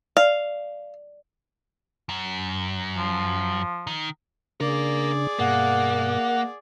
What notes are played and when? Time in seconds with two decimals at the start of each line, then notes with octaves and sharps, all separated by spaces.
0.17 D5 F5
2.09 F#2
2.97 F3
3.87 D#3
4.61 C#3 A#3 D4 G#4 A#4 D5
5.39 G2 B2 A#3 F#5